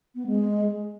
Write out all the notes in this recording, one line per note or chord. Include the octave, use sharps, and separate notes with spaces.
B3
G#3